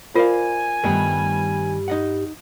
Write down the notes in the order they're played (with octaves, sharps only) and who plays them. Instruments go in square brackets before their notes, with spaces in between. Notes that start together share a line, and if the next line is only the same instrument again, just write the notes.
[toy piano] F4 A#4 [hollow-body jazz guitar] C5 D5 F5 [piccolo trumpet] G#5
[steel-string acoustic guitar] G2 G3 [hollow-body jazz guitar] D#3 A3 B3
[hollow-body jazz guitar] D#4 D#5 F#5